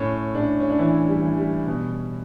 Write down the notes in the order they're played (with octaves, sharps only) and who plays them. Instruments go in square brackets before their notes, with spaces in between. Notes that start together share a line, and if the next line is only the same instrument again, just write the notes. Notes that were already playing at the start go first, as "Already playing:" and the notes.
Already playing: [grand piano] A2 C#4
A2 D4
C#4
D4
E3 E4
G3
E3
G3
B2